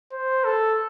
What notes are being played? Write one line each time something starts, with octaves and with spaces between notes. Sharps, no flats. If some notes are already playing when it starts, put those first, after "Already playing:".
C5
A4